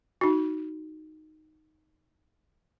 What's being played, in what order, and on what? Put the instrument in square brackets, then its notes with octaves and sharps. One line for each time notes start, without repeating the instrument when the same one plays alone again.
[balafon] D#4 F#4